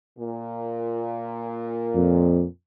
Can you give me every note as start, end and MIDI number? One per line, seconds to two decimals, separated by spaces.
0.18 2.45 46
1.95 2.44 41